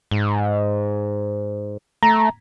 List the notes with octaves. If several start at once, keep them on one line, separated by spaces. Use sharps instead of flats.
G#2
A3 A#5